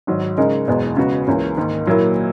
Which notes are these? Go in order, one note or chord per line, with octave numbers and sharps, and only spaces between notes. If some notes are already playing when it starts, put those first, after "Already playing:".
G#1 G#2 F#3
C#3 G#3 D#4 A#4
F#1 E2 B2 G#3
C#3 G#3 B3 F#4 B4
C#2 C#3 E3 A#3 C#4
G#2 D#3 A#3 D#4
A#2 F#3 A#3 E4